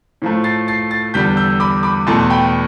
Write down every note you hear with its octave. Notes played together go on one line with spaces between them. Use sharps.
A2 F3 A3
A6 C7
A6 C7
A6 C7
E2 D3 G3 G6 B6
E6 G6
B5 D6
B5 D6
E2 B2 A3 A5 C6
G5 B5